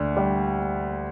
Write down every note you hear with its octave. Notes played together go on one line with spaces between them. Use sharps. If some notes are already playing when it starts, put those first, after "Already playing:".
Already playing: D2 D4
G3